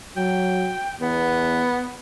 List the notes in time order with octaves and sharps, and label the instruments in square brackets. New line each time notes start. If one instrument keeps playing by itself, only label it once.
[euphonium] F#3 [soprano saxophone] G5
[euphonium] E2 [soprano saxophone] B3